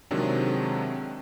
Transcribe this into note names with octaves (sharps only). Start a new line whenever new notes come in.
C3 D#3 F#3 G#3 C4 D4